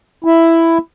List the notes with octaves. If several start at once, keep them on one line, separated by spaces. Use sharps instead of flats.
E4